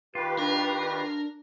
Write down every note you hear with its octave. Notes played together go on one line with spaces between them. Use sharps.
D#3 F4 G4 B4
D4 A#4